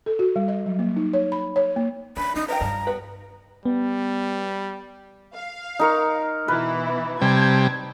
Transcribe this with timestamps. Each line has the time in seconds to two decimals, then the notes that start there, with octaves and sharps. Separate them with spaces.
0.06 A4
0.19 F#4
0.36 G3
0.48 D#5
0.66 F#3
0.79 A#3
0.96 D#4
1.13 C#5
1.32 B5
1.56 C#5
1.76 A#3
2.17 E3 C#4 D4 B5
2.36 C#4 D#4
2.48 B4 D#5 G5 A#5
2.61 G2 F3 D5 A5
2.87 G3 B3 B4
3.65 G3 B3
5.34 F5
5.79 D#4 A#4 C#6
6.48 B2 E3 E4 B4
7.21 C3 G3 A5 G#6